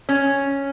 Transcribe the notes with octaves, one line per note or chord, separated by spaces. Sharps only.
C#4